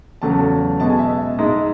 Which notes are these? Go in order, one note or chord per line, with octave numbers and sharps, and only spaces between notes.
E2 C#3 F#3 A3 A5
A5
B2 G#3 A5
G#5
E5
E5
G#2 G#3